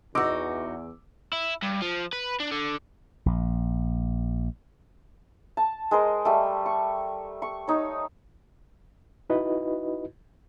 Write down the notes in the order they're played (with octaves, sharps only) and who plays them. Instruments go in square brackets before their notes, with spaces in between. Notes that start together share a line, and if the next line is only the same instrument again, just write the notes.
[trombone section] E2 [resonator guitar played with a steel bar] D#4 F#4 [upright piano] D6 E6
[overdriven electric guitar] E4
G2
F3
B4
D4
D3
[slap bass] A#1
[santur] A5
G#3 A#4 C5
G3 A3
C#6
C#6
D#4 C#5
[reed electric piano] D#4 E4 F#4 B4 D#5